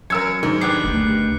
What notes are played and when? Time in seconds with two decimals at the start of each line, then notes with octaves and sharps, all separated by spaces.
0.10 F#2 A#4 E6 G#6 C#7
0.43 G#2 D#3
0.61 B3 D4 G4 F#6 C7
0.84 F#1 D2